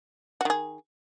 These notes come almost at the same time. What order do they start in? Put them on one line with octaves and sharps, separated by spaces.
F#4 D#3 G#4